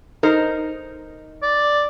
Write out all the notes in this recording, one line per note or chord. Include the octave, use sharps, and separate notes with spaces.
D#4 A#4 C5
D5